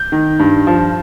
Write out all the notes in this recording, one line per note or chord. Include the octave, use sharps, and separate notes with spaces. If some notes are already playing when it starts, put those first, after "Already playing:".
Already playing: G6
D#3
G2
F3